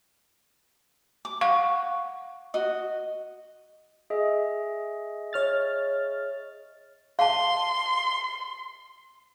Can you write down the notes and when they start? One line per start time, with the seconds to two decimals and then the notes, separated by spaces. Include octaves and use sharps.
1.25 D6
1.41 F5 F#5 C#6
2.54 F#4 D#5
4.10 G#4 D#5 E5
5.33 C#5 F6 A6
7.19 F5 A5 C6